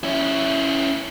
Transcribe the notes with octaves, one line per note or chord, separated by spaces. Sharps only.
C#4 E4